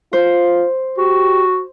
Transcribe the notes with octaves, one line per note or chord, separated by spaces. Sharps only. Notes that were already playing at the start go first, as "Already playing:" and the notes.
F4 C5
F#4 G4